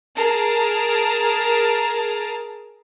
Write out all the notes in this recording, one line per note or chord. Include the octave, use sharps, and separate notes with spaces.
G#4 A#4 A5